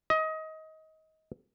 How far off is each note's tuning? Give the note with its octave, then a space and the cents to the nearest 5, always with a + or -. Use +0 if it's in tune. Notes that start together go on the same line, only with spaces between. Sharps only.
D#5 +25